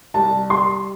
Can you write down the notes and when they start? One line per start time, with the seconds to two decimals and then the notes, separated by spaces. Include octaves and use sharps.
0.14 C2 A5
0.50 G3 C6